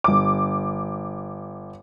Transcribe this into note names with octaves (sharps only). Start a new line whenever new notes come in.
G1 D6